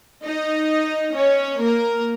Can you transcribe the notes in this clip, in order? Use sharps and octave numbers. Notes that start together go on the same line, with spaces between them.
D#4 D#5
C#4 C#5
A#3 A#4